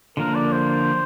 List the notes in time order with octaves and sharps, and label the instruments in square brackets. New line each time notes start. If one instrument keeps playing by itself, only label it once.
[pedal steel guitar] D3 F3 A#3 D4 [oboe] A#4
[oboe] D5
C5